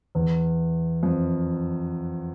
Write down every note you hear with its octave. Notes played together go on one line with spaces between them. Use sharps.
E2
F2